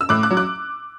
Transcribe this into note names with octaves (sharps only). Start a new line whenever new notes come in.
E6
A2 D6 F#6
D6 F#6
F#3
D6 F#6